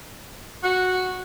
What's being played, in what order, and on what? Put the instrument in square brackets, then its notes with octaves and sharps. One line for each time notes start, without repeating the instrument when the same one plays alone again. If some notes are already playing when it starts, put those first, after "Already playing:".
[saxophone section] F#4